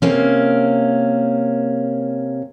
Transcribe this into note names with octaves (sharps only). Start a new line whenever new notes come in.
C3 A#3 C#4